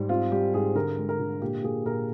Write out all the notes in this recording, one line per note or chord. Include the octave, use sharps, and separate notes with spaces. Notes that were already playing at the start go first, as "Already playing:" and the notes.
Already playing: G#2 G3
C4 F4
G3 G4
G#2 G#4
D3 A#4
G#3
A#4
D3
A#2 G4
A#2 G#4
A#2 A#4